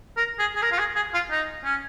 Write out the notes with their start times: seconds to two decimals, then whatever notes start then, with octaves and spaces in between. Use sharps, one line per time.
0.17 A#4
0.39 G#4
0.56 G#4
0.62 A#4
0.72 F4
0.79 G#4
0.96 G#4
1.14 F4
1.31 D#4
1.64 C#4